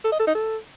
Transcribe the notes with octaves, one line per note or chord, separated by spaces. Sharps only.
A4
D#5
A4
D#4
A4